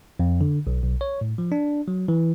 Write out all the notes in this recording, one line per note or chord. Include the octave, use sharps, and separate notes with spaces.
F2
D3
B1
B1
C#5
A2
F3
D4
F#3
E3